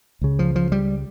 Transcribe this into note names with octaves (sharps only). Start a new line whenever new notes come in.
C#2 C#3
F3
F3
G3